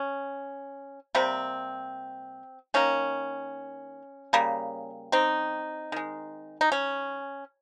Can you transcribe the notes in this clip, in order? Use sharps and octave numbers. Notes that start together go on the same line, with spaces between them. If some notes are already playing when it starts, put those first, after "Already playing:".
Already playing: C#4
C3 G3 A#3 C4
D#3 A#3 C#4
C#3 G3 A#3
C4 D#4
D#3 G#3
D#4
C#4